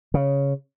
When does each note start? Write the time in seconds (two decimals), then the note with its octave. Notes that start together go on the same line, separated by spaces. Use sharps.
0.14 C#3